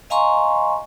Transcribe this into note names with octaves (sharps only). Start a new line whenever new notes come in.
D#5 F5 G#5 A#5 C6 C#6